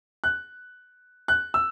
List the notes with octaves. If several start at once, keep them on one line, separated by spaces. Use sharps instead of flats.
F#6
F#6
E6